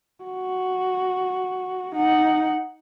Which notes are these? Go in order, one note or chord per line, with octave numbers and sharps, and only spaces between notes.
F#4
D#4 F#5